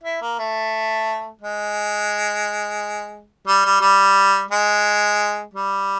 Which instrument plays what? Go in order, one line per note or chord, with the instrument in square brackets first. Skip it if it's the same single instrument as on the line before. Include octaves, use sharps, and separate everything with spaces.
[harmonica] E4
A#3
A3
G#3
G3
G3
G3
G#3
G3